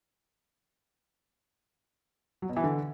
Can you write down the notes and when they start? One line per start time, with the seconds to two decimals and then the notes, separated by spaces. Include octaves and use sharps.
2.42 F#3
2.49 B2
2.57 E3
2.64 D3